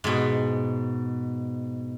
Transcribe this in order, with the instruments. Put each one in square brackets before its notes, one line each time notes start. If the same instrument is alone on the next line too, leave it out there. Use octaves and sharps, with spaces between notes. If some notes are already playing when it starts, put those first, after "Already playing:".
[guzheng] G#2 B2